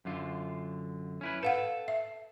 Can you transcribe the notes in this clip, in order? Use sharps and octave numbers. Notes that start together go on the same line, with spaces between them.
F#2 D3 F4
C#4 E4 B4
A4 B4 F5 F#5
E5